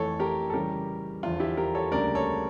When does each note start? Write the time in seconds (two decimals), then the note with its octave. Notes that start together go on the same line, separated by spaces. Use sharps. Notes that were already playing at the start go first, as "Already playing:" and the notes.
Already playing: F2 E3 A3 A4 C#5
0.20 G4 A#4
0.50 A4
0.54 C#3 E3 G3 C#4 G4 A#4
1.23 E2 D3 F3 F4
1.40 E4 G4
1.57 G4 A#4
1.75 A4 C#5
1.92 D2 C#3 G3 A#3 D4 A#4 D5
2.15 A4 C#5